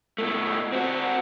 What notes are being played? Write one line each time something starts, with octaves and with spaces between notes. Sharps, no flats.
B2 A3
C4 F#4